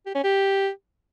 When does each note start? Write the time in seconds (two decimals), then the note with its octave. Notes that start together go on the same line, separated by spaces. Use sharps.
0.06 G4
0.15 C#4
0.24 G4